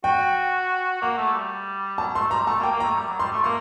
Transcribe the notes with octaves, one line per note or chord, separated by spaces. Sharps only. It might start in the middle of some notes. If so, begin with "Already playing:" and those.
F#4 G5
A#3 F#5
A3
G3
F#3 A5
A3 C6
G3 A#5
A3 A5
A#3
G5
A#3
A#5
A3
G3
F#3
G3 C6
A3
A#3 C6